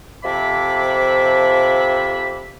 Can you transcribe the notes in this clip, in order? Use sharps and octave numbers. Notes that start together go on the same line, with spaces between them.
F2 C3 F3 E5 B5 D6